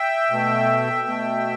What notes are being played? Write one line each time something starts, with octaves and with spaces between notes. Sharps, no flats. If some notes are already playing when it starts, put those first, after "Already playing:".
Already playing: E5 G5
B2 A3
B2 A3